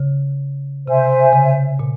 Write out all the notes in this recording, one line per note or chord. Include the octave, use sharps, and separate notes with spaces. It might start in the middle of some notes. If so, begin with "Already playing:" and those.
Already playing: C#3
C3 C5 E5 G#5
C#3
A#2